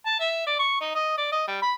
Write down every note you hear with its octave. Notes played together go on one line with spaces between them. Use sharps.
A5
E5
D5
C#6
D#4
D#5
D5
D#5
G3
B5